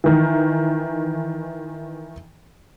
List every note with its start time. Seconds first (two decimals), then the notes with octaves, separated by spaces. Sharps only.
0.04 D#3 E3